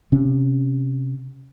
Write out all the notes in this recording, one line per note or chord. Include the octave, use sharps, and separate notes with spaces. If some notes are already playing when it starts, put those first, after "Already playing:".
C3 C#4